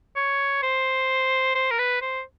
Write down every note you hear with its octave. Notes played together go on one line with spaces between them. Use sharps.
C#5
C5
C5
A#4
B4
C5